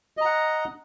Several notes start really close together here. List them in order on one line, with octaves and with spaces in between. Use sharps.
D#5 A#5 F#5